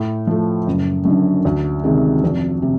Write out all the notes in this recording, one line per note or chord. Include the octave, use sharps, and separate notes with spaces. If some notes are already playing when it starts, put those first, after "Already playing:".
Already playing: A2
F3 A3
F#1
F#2 D3
D2
C3 D#3 G#3
F1
C3